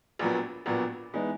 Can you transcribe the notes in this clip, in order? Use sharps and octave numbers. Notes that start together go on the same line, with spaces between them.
A#1 A#2 F#3 B3
A#1 A#2 F#3 B3
E3 G#3 B3 D#4